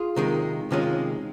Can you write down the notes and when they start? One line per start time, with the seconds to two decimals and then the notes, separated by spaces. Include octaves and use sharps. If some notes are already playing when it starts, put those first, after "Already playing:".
Already playing: F4 G#4
0.16 C3 D#3 G#3
0.71 C3 D#3 G#3 C#4 F4